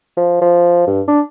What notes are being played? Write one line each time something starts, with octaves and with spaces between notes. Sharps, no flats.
F3
F3
G2
D4